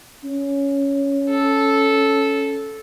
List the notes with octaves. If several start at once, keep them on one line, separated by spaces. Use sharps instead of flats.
C#4
A4